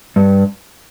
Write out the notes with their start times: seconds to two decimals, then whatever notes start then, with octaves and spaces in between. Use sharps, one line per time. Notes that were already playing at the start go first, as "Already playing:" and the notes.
0.16 G2